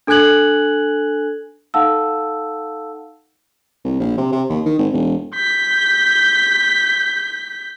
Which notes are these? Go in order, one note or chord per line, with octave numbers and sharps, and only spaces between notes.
D4 A4 G#5 F#6 G#6 F#7
D#4 A4 F5 F#5 A5 E6
C2
A#1
C3
C3
D#2
D#3
G#1
E1
G6 B6